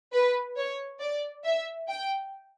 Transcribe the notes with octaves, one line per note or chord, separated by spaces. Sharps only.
B4
C#5
D5
E5
G5